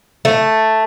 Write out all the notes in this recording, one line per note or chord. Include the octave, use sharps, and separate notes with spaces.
A3